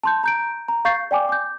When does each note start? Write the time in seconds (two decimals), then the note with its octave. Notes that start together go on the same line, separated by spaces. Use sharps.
0.03 A5 C6 G6
0.24 A#5 G6 D7
0.68 A#5
0.85 F5 C#6 G6 A6 C7
1.11 D5 G5 G#5 D6
1.29 D6 G6